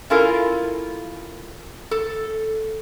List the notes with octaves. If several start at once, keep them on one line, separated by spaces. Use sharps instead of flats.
C#4 E4 F4 A4 A#4
A4